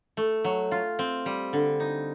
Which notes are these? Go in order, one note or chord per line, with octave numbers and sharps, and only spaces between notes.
A3
F#3
F4
C4
G3
D3
D#4